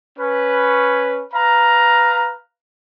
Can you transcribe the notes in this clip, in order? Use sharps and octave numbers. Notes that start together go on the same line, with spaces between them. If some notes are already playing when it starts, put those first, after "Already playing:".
C#4 B4
B4 F5 A#5